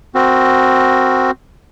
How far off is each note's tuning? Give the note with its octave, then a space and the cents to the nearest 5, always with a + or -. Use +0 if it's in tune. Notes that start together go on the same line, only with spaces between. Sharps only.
C4 +0 F#4 +0 A#4 -10